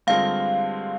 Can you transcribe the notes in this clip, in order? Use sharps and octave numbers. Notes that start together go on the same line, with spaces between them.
G2 D3 G#3 C4 F4 F5